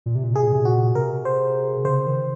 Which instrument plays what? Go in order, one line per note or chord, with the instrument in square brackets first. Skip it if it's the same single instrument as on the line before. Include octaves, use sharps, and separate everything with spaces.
[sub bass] A#2
C3
A#2
[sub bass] C3 [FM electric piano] G#4
[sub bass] A#2
C3
[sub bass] A#2 [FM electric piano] F#4
[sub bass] C3 [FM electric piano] A#4
[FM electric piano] C5
[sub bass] C#3 [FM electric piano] C5
[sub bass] D#3